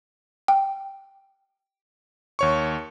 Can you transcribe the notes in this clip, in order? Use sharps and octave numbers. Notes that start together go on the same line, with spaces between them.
G5
D#2 C#5 C#6